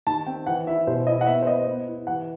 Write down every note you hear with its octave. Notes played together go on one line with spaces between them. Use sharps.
D#3 A5
C4 G5
E3 F#5
E4 E5
B2 C5
E4 D#5
F#5
B3 E5
C5
B3 D#5
B3
E4
E3 F#5